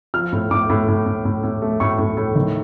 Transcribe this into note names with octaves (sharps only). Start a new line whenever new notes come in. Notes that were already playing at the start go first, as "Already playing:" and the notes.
F3 F6
A2
A2 D6
A2
A2
A2
A2
A2
A3
A2 C#6
A2
A2
D#3